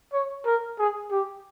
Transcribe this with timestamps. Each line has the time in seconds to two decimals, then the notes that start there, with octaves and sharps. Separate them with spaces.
0.13 C#5
0.46 A#4
0.79 G#4
1.11 G4